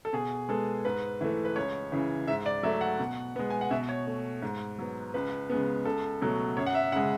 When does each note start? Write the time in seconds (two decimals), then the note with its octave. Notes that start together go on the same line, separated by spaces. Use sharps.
0.05 A4
0.13 B2 G#4
0.49 G#3 B3 A4
0.85 G#2 B4
1.21 E3 A3
1.45 B4
1.56 C#2 C#5
1.92 C#3 E3
2.27 G#2 E5
2.46 D5
2.63 F#3 A3 E5
2.81 F#5
2.99 B2
3.36 G#3 B3
3.50 G#5
3.61 F#5
3.71 B2 E5
3.89 C#5
4.07 A3
4.42 G#2
4.79 F#3 B3
5.14 C#2 B4
5.50 C#3 G#3 B3
5.85 C#2 A4
6.22 B2 F#3 A3
6.57 F#2 C#5
6.66 F#5
6.75 E5
6.92 C#3 F#5
6.96 G#3